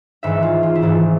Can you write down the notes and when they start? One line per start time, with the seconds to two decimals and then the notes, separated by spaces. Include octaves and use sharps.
0.23 G#1 G#2 E3 E5
0.43 F4
0.63 F4
0.75 E4
0.82 G#1 G#2 E3 F4